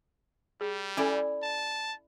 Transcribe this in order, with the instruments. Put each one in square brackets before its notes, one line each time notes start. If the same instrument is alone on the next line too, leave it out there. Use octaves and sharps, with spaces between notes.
[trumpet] G3 [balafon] G#4
[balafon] C#4 A4 G#5 [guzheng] E4 D5
[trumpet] A5